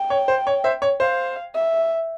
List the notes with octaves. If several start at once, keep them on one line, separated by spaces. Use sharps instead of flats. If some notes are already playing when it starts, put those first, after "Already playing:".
Already playing: G5
C#5
C5
C#5
C5 E5
C#5
C5 F5
E5